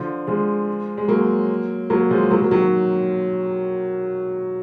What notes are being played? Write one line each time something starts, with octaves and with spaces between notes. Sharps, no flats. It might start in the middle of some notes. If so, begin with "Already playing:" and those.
Already playing: D3 F3
F3 G#3
G#3
F#3 A#3
F#3 A#3
F3 G#3
F#3 A#3
F#3 A#3
D#3 F#3